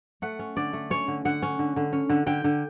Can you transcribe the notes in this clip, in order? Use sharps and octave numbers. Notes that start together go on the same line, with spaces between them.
A3 F#5
C#4
D3 D5
A3
C#4 C#5
D3
D3 F#5
C#4
D3
D3
C#4
D3
D3 G5
D3